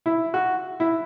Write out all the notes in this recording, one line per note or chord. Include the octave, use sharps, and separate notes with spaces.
E4
F#4
E4